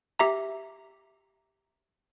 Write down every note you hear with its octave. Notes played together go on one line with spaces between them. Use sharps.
G4 E5 A#5